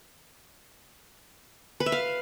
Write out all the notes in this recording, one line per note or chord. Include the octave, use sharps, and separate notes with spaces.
B4
E5
F5